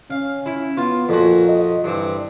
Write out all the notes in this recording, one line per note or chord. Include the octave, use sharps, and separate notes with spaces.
C#4 F5
E4
B3 F4
F2 A#2 F#4
D#5
G2 E3 C4